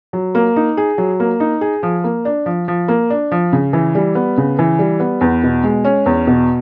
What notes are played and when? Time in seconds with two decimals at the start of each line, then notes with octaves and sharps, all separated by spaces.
0.13 F#3
0.35 A#3
0.56 D#4
0.77 G#4
0.98 F#3
1.20 A#3
1.40 D#4
1.61 G#4
1.83 F3
2.04 A#3
2.25 D4
2.46 F3
2.68 F3
2.88 A#3
3.10 D4
3.31 F3
3.53 C#3
3.73 E3
3.95 G3
4.15 B3
4.37 C#3
4.59 E3
4.79 G3
5.00 B3
5.21 E2
5.43 B2
5.64 G#3
5.84 C#4
6.06 E2
6.27 B2